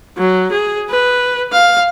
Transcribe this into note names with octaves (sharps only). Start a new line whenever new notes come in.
F#3
G#4
B4
F5